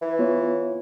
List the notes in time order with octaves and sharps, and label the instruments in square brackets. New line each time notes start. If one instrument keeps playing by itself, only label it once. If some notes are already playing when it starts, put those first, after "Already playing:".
[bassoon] E3
[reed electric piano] B3 F4 C#5